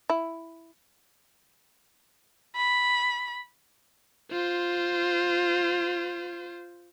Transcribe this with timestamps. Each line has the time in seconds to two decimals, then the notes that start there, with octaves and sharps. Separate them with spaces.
0.10 E4
2.56 B5
4.32 F4 C5